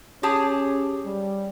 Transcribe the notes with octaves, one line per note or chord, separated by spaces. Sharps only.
C#4 G4 G#4 A5
G3